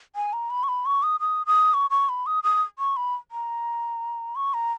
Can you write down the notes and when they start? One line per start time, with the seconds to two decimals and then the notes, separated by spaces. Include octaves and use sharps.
0.16 G#5
0.33 A#5
0.50 B5
0.63 C#6
0.68 B5
0.86 C#6
1.03 D#6
1.20 D#6
1.47 D#6
1.74 C#6
1.91 C#6
2.09 B5
2.26 D#6
2.44 D#6
2.79 C#6
2.97 B5
3.31 A#5
4.36 C#6
4.54 A#5